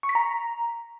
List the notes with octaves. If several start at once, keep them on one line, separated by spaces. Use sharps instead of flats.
C#6
B6
A#5